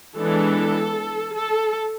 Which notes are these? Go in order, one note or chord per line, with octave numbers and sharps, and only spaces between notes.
E3 G#3 B3 D4 A4
A4